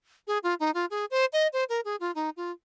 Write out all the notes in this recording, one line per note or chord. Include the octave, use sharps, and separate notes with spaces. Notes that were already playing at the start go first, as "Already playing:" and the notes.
G#4
F4
D#4
F4
G#4
C5
D#5
C5
A#4
G#4
F4
D#4
F4